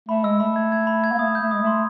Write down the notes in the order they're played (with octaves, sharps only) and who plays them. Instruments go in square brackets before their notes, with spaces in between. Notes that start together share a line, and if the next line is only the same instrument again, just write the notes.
[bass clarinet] A3 [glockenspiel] B5
[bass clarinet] G#3 [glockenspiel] E6
[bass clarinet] A3 [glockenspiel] B5
[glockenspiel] G#6
G#6
B5
G#6
[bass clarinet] A#3
[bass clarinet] A3 [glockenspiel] D#6
[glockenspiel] G6
[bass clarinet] A3
[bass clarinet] G#3 [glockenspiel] D#6
[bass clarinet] A3 [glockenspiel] C6